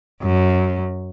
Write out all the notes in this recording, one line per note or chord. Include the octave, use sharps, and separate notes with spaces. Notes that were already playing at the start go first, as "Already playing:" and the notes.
F#2